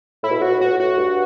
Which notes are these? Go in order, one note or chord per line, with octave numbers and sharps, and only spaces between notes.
A2 E4
B2
A2 F#4
B2
A2
B2 F#4
A2
F#4
G2